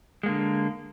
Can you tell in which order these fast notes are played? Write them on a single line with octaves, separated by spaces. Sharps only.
G#3 A#3 D3